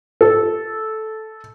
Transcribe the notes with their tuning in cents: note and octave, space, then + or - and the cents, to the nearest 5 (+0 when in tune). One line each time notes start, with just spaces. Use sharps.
A4 -10